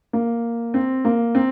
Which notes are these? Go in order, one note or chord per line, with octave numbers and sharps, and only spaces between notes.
A#3
C4
A#3
C4